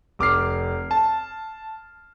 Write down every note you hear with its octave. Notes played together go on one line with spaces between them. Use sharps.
F1 D6 F6 C7
A5